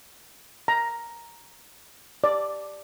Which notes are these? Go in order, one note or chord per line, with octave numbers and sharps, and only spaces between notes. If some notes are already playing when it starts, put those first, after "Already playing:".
A#5
D5